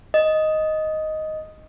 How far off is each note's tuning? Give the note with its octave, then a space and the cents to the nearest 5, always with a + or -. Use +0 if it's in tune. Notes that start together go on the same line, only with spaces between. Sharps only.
D#5 +5